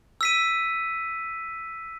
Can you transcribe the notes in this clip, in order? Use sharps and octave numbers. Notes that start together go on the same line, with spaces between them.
E6 B6 D#7